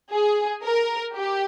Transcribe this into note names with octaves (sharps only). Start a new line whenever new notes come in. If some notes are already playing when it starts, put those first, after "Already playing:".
G#4
A#4
G4